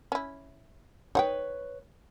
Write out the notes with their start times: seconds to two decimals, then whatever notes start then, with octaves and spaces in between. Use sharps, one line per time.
0.12 C#4 E4
1.15 D#4 B4 C#5 F#5 G5